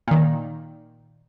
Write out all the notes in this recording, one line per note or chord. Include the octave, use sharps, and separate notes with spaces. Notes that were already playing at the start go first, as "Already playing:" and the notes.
A#2 D#3